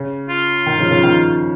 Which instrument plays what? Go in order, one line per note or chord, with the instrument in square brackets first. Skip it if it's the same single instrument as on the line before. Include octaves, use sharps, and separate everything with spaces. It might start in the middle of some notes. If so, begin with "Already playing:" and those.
Already playing: [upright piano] C#3
[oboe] F4
[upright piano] D#3
C#3 F3
C#3 F3
D#3